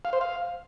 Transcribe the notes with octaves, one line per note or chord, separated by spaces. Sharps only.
F5
C5
F5